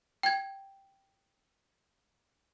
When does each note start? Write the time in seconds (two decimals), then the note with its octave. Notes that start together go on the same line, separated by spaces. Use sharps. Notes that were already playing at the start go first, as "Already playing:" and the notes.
0.23 G5 G#6